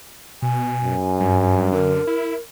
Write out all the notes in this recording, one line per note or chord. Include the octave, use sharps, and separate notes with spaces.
B2 G#5
F#2
G2
D3 A#4
E4